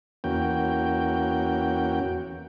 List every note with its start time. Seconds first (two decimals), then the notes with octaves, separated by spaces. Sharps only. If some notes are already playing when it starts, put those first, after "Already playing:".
0.24 E2 A#3 C#4 F#4 G5